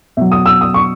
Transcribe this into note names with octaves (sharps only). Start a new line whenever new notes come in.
B2 F#3 E5
D#6
E6
D#6
C#6